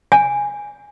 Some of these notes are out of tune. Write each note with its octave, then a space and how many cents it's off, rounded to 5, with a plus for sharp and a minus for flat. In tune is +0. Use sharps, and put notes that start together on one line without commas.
G#5 -10